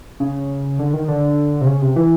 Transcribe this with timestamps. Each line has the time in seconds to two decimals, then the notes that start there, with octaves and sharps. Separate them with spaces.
0.20 C#3
0.79 D3
0.94 D#3
1.08 D3
1.61 C3
1.67 C#3
1.81 C3
1.96 E3